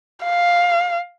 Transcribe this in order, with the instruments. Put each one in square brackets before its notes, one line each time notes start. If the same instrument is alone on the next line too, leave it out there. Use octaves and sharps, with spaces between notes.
[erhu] F5